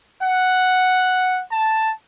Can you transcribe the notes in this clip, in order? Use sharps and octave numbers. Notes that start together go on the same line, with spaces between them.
F#5
A5